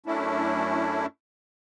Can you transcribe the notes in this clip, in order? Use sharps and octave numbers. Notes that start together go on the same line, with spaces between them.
F#2 A3 C#4 D4 E4